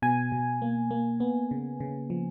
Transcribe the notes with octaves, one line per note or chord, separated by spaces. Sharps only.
B2 G#5
B2
A#3
A#3
B3
C#3
C#3
F3